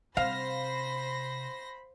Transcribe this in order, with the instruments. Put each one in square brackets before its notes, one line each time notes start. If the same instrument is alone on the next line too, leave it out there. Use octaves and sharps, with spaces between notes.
[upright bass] C3 [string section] C5 A#6 [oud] F5 [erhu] B5